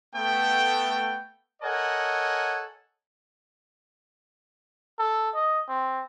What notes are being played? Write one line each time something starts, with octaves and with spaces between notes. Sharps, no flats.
A3 B3 G5
A4 A#4 C#5 D#5 F#5 G#5
A4
D#5
C4